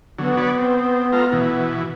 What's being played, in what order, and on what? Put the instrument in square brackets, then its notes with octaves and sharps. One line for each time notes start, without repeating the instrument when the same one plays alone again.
[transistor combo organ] D3 F#3 [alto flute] B3
[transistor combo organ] B4 C#5 D5
C4
A3 F4 A#5
B2 E3